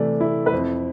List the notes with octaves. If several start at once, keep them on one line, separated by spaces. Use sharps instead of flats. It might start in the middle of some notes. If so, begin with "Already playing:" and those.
Already playing: C3 E3 A3 A4 D5
E4
B4
F2 C5